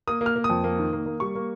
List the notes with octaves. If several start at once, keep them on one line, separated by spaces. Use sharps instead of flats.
A#3 D#6
A#3
F6
A#3
D#6
F2
A#3
D#3
A#3
A#3
G3 C#6
A#3